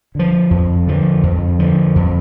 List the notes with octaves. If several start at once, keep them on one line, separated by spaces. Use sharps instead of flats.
D3 F3
F2
D3 F3
F2
D3 F3
F2